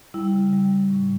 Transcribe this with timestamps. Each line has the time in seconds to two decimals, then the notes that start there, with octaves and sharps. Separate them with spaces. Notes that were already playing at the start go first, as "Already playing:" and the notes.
0.14 G3 E4
0.34 C#3
0.53 G3
0.71 G3
0.90 A2